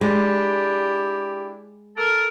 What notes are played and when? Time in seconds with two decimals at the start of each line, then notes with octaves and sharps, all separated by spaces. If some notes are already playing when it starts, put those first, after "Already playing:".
0.01 G#3 D4 E4 G4
1.97 A4 A#4